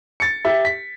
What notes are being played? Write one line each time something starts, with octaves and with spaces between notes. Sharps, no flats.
A6 C#7
G4 E5
B6